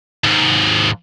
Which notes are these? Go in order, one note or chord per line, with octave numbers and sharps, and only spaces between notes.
D#2 G#2